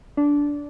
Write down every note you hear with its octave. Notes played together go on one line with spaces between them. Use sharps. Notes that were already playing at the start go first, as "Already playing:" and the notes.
D4